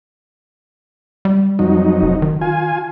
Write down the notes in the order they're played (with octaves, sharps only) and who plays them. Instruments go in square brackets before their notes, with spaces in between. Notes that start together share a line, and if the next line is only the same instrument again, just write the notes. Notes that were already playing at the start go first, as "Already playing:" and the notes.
[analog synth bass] G3
[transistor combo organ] F2 F#3 D#4
[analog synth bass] F1
D#3
[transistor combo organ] F4 G#5